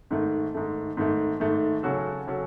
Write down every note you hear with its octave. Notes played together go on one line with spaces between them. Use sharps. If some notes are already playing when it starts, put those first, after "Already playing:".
G#2 D#3 A3
G#2 D#3 A3
G#2 D#3 A3
G#2 D#3 A3
C#3 F#3 C#4 F#4 A4
C#3 F#3 C#4 F#4 A4